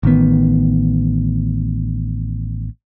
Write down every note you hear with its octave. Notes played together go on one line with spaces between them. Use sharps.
A1 D#3 B3